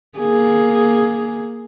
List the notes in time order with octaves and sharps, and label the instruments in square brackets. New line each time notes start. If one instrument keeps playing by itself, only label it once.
[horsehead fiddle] A#3 G#4